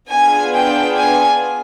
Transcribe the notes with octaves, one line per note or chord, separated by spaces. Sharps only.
B3 D4 F4 G#4 G#5
G5
G#5